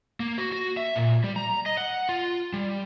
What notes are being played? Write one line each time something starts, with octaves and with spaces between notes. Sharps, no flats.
A#3
F#4
F#4
E5
A#2
G3
A#5
D#5
F#5
F4
G3